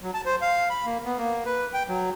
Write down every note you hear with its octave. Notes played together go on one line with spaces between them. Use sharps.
F#3
A5
C5
F5
B5
A#3
B3
A#3
B4
G5
F#3